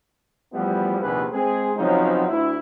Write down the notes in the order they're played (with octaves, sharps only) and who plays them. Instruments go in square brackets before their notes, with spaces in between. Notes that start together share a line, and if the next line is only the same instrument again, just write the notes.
[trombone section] E2 F3 G3 A3 B3
A#1 D#2 C3 B3 G#4 B4
G#3 C4 G#4
C#3 F3 F#3 B3 C4 D#4
D2 E4